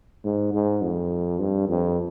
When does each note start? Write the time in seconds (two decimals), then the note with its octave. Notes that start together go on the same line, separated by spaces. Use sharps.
0.24 G#2
0.53 G#2
0.82 F2
1.40 G2
1.68 F2